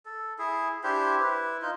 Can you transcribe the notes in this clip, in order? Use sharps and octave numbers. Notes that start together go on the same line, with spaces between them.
A4
E4 G#4
D4 E4 G4 C5
E4 B4
D#4 F4